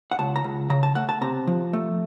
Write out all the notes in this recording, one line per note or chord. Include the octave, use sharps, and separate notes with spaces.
F#5
C#2 A5
A#5
C#2
C#3 A#5
A5
A3 F#5
A5
C3 A#5
F3
A3